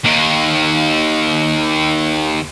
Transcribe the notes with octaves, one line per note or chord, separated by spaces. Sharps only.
D#2 D#3